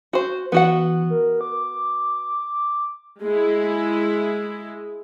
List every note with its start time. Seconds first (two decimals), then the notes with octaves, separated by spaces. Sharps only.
0.13 F#4 C5
0.52 E3 B3 F#4 F#5
1.10 A#4
1.41 D6
3.20 G#3 E4